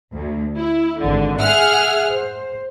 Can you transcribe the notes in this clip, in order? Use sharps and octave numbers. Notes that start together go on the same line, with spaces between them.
D2
E4
G#1 D3
G#4 E5 F#5 F6
C5